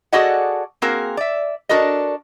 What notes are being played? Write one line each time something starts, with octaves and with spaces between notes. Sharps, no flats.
F#4 G#4 A4 D5 D#5 F#5
A#3 C4 F#4 G#4 A#4
D5 E5
D4 F#4 A4 A#4 D#5